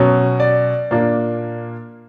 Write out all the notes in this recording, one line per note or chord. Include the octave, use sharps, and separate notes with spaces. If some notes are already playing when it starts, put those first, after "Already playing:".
Already playing: B2 F#3 C#4
D5
A#2 A#3 D4